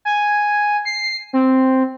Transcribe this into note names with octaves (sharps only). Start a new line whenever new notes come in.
G#5
C7
C4